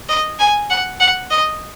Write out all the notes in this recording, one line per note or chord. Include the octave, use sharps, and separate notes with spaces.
D#5
G#5
F#5
F#5
D#5